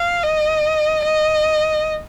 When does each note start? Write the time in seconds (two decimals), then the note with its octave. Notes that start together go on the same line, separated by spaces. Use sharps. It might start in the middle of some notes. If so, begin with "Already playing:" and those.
Already playing: F5
0.23 D#5
1.05 D#5